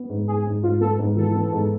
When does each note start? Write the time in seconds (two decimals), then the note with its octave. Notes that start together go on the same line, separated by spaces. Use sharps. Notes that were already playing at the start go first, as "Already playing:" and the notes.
Already playing: B3
0.09 G#2
0.28 G#2 G#4
0.46 G#2
0.63 G#2 F4
0.80 B3 A4
0.99 G#2
1.16 E3 A4
1.35 B3
1.52 G#2